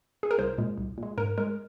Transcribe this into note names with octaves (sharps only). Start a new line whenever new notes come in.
G#4
A#4
C2 C5
A#2 G#3
C2
A#2 G#3
G#2 A#4
G#3 A#4